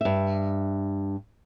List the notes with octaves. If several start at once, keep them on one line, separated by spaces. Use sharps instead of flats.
G2 E5